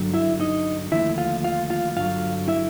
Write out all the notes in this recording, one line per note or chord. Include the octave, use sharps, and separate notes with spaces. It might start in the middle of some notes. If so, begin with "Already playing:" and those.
Already playing: G2 D3 F#3
E4 E5
D#4 D#5
D#2 D3 F3 A3 E4 E5
F4 F5
F4 F5
F4 F5
G2 D3 F#3 F4 F5
E4 E5